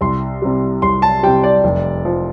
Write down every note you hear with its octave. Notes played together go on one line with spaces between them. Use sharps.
C2 C6
C3 G3
C2 C6
A5
C3 G3 G5
D5
F1
F3